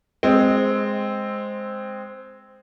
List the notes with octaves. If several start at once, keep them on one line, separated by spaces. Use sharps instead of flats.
G#3 C4